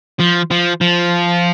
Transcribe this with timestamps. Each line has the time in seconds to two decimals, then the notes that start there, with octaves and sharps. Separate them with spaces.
0.20 F3
0.51 F3
0.81 F3